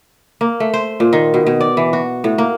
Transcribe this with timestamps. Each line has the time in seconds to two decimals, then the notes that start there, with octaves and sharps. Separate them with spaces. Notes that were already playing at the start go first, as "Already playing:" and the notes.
0.41 A#3
0.60 A3
0.74 C5
1.00 A#2
1.13 D#3
1.34 B2
1.47 B2
1.61 D5
1.77 E3
1.93 F#4
2.24 A2
2.38 A#3